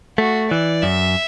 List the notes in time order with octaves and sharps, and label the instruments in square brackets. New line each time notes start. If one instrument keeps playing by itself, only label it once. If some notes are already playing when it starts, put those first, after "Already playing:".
[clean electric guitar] A3 [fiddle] F#4
[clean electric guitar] E3 [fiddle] D5
[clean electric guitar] F#2 [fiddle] E5